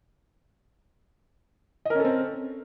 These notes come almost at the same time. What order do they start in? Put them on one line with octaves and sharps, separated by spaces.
D#5 A#4 C#4 A4 C4